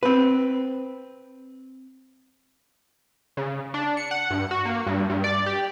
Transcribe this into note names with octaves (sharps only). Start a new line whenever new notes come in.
C4 B4
C#3
D4
C#7
F#5
G2
F#4
A#3
G2
G2
D5
G4